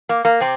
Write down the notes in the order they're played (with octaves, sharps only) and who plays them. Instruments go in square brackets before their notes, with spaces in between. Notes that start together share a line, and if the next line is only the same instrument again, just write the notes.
[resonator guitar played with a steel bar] A#3
A#3
C3 C4